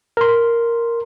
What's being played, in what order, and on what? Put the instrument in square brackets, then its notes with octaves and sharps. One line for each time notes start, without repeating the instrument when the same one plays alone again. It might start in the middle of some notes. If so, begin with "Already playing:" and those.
[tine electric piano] A#4 C6